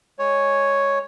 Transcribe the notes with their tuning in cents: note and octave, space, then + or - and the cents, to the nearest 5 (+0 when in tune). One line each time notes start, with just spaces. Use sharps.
G#3 +0 C#5 +0 G#5 +0